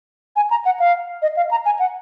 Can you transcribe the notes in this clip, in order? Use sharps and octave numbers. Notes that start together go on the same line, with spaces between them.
G#5
A#5
F#5
F5
D#5
F5
A#5
G#5
F#5